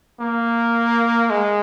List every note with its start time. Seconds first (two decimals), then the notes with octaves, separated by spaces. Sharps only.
0.21 A#3
1.30 G#3